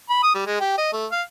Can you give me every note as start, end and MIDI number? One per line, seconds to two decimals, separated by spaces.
0.10 0.20 83
0.23 0.31 87
0.34 0.43 55
0.46 0.57 56
0.60 0.75 67
0.78 0.88 75
0.93 1.05 57
1.11 1.22 77